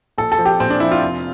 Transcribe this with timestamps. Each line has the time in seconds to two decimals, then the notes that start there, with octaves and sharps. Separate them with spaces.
0.18 A#1 A4
0.32 A4
0.39 F3
0.45 G4
0.60 A#1 C4
0.70 D4
0.80 F3 E4
0.91 F4
1.02 F1